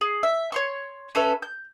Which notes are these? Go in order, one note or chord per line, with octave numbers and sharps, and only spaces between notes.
G#4
E5
C#5 C6 C#6
C#4 A4 B4 E5
G6